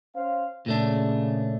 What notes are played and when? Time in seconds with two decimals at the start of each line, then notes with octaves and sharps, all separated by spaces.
0.15 C#4 C5 F5
0.66 A#2 C#3 A3 D4